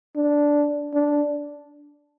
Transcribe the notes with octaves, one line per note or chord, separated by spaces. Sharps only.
D4
D4